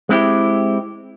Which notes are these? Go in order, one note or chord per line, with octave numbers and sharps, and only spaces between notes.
G#3 C4 E4 G4